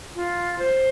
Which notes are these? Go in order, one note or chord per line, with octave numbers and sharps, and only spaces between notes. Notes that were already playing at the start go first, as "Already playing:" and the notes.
F4
C5